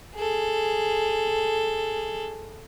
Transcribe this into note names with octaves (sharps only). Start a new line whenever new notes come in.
G#4 A4